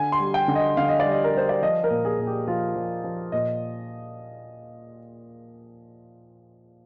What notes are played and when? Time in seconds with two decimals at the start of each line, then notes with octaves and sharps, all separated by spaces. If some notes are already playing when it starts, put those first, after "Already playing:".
Already playing: D3 G#5
0.12 C6
0.20 G3
0.34 G5
0.48 D3
0.55 D#5
0.77 D3 F5
0.89 D#5
1.00 D5
1.05 G3
1.11 D#5
1.24 A#4
1.34 G3 C5
1.49 D5
1.62 F3 D#5
1.84 A#4
1.90 A#2
2.05 G#4
2.19 A#2
2.27 G4
2.48 F3 F4
2.76 F3
3.04 F3
3.32 A#2 D#5